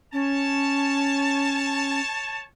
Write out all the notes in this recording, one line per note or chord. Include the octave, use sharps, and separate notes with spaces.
C#4 C#5 A5